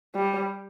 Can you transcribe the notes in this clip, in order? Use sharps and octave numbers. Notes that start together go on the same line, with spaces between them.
G3